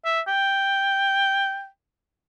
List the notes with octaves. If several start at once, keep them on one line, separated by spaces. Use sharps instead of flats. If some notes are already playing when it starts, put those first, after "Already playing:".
E5
G5